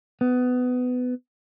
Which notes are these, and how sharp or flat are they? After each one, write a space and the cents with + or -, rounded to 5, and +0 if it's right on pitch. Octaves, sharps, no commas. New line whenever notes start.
B3 +20